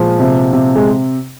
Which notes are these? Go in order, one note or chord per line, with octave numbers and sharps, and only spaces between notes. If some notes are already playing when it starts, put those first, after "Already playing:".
Already playing: A#2 F3 G#3
C3
C3
G#3